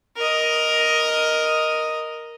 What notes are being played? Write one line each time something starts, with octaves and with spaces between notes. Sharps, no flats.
A#4 D#5